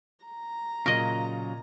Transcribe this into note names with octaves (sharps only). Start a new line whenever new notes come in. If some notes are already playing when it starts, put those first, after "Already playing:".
A#5
A#2 C#3 F#3 A#4 D#5